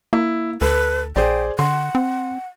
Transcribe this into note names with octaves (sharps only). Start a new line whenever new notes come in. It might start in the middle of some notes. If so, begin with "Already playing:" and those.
A#3 E4
D2 A4 B4
A#1 G#4 C5 D5 G5
D3 F#5 C6
C4